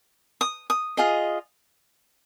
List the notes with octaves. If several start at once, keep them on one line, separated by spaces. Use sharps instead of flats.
D#6
D#6
F4 G#4 D#5